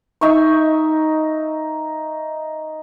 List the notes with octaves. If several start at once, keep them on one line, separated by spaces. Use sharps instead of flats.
D#4 E5 C#6